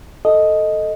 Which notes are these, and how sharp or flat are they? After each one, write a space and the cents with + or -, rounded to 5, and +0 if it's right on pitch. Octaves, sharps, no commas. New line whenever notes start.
A4 +0 D#5 +0